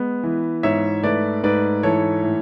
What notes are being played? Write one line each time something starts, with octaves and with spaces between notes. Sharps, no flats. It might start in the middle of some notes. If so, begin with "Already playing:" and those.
Already playing: G#3 B3
E3
G#2 C#5 E5
A3 B4 D5
G#2 B4 D5
E3 A4 C#5
A2